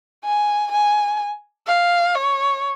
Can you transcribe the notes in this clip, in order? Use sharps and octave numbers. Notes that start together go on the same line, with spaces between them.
G#5
G#5
F5
C#5